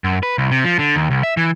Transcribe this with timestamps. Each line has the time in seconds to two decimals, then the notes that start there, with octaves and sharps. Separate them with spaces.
0.04 F#2
0.23 B4
0.38 C2
0.51 C3
0.64 F3
0.79 D3
0.96 D#2
1.11 C2
1.23 E5
1.37 E3